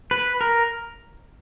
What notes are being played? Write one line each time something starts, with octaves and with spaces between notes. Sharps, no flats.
B4
A#4